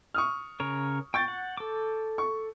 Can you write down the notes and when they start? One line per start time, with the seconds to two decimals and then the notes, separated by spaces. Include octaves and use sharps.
0.14 C#6 D#6 F6
0.60 C#3 A#4 C#5
1.14 G5 C#6 G6 A6
1.28 F#5
1.57 A4 D6
2.18 C#6